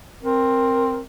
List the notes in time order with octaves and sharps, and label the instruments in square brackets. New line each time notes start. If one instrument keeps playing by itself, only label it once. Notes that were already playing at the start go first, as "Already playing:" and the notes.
[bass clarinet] C4 [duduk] A#4